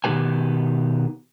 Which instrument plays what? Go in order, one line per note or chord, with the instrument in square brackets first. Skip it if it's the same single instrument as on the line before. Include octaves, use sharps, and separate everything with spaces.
[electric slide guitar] B2 D#3 A#3 G4 B4 G#5